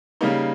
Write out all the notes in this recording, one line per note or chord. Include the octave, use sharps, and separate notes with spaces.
C#3 G3 A#3 D#4